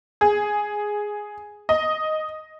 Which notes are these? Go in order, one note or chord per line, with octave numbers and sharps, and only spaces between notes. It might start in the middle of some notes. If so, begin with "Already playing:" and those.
G#4
D#5